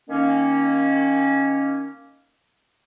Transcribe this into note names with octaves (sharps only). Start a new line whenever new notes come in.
D#3 A#3 C#4